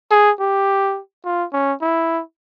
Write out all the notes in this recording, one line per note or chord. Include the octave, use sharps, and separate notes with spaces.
G#4
G4
F4
C#4
E4